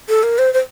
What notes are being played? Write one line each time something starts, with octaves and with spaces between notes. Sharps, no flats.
A4
A#4
C5
C5